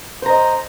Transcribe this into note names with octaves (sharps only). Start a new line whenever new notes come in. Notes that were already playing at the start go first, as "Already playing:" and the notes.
C5 D#5 A#5